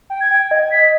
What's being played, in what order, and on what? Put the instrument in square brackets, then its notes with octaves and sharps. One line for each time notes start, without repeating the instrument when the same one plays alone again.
[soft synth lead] G5
[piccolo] G#6
[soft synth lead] G5
[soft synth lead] D#5 [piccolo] G#6
[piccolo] G#6
B6